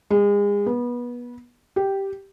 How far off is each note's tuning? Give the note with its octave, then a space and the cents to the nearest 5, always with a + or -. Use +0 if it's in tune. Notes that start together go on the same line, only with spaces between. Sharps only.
G#3 -35
B3 -25
G4 -5